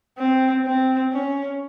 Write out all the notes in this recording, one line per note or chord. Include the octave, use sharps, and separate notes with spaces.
C4
C4
C#4